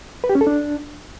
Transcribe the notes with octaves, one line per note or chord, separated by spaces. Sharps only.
B4
G4
C#4
A4
D4